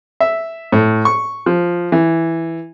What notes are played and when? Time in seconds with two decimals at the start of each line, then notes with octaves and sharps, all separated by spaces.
0.20 E5
0.72 A2
1.05 C#6
1.46 F3
1.92 E3